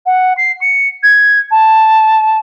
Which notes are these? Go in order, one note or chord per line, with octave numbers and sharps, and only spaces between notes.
F#5
C7
C#7
G#6
A5